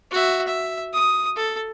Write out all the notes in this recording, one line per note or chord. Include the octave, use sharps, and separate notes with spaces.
F#4 E5
E5
D#6
A4